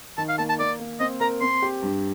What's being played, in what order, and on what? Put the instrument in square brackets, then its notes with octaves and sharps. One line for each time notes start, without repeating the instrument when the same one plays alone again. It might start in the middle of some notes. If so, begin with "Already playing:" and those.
[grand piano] D#3 [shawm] A5
[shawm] F5
[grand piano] A#3 [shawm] A5
[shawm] A5
[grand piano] A#3 [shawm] D5
[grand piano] A#3
[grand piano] C4 [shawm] D#5
[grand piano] A#4 [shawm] A#5
[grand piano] C4 [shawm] C6
[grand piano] G4
G2